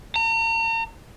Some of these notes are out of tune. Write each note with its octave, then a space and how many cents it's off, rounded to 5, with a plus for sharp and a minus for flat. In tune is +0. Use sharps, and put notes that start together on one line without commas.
A#5 -40